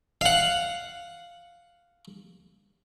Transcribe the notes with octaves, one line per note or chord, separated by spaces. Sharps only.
F5 F#5